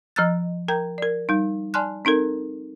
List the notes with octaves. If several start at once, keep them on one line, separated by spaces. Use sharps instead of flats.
F3 D#5 A#5 E6 F#6 A6
A#4 G5 A#5 G6
A#4 D5
G3 D#4
D5 G#5 A5 C6 F6 F#6
C4 D#4 A4 A#4